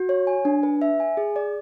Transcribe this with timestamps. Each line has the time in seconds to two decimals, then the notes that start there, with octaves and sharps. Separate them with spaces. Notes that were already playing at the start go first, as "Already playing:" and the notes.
Already playing: F#4
0.09 C#5
0.27 G#5
0.45 D4
0.63 B4
0.82 E5
1.00 G#5
1.17 G#4
1.36 D5